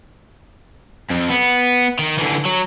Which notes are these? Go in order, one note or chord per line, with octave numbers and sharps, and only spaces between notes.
F2
B3
D#3
D3 E3
F#3